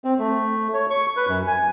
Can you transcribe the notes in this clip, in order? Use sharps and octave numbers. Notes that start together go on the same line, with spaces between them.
C4
A3
C#5
C#6
B4
F#2
G#5